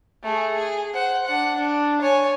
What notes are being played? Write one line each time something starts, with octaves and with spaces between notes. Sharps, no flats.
A3 G#4
G#4
C5 F#5
D4 F#5
D4
C#5 G#5